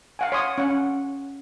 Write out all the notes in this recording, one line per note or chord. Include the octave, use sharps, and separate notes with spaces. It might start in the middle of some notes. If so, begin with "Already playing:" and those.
F5 F#5 G#5
C#5 C6 D#6
C#4 F#5